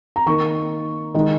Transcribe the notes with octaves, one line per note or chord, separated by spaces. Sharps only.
A#5
D#3 A#3 C#6
D#3 G#3